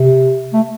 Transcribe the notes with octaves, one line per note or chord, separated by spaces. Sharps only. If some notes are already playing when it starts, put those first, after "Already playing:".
Already playing: C3
A3